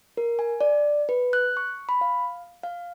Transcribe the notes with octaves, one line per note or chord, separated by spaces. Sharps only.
A#4
G#5
D5
B4
F#6
C#6
B5
F5
F5